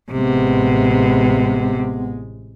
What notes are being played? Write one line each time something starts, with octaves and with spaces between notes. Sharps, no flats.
A1 C3 G#3 B3